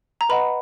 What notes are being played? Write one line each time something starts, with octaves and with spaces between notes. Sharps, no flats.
A#5
B4 D#5 F#5 B5